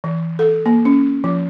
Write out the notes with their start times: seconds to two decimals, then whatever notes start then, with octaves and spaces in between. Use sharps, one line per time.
0.04 E3
0.39 A4
0.66 A#3
0.85 C#4
1.24 F3